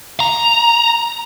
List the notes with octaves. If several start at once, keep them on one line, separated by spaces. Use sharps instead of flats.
A#5